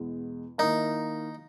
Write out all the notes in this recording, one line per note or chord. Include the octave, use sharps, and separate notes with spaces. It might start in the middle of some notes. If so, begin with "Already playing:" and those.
Already playing: E2 B2 G#3 B3
D#3 A#3 D#4 E4 A#4